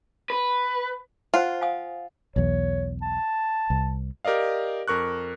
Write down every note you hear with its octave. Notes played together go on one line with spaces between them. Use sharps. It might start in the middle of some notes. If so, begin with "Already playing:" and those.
B4
F4 C5 F#5 G#5
F5 G#5 D#6
B1 E2 C#5
A5
C2
G4 A#4 D5 D#5 F5
F2 A#4 C#6 F#6